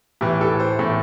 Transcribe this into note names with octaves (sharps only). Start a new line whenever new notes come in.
A2 E3 G4
A4
C5
A2 E3 A4